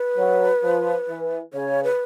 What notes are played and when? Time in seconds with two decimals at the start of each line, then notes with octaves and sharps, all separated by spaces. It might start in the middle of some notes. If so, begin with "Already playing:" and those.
Already playing: B4
0.17 F#3
0.63 F3
1.09 E3
1.53 C#3 C#5
1.84 B4